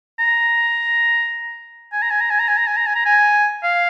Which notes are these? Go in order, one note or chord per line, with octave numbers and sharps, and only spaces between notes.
A#5
G#5
A#5
G#5
A#5
G#5
A#5
G#5
A#5
G#5
A#5
G#5
A#5
G#5
F5